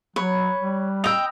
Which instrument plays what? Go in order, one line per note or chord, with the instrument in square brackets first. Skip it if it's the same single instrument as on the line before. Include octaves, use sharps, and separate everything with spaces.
[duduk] F#3 [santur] B4 [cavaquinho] C#5
[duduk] G3
[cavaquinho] D#5 G5 [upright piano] E6 F7